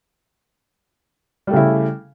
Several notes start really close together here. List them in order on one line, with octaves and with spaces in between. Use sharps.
G3 A3 C#3 E4